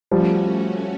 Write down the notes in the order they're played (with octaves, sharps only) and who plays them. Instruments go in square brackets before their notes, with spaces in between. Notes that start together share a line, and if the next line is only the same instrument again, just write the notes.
[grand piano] F3 G3 [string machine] A3 C#4 F#4